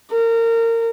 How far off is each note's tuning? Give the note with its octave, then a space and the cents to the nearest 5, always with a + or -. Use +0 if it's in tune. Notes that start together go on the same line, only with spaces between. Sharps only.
A#4 -25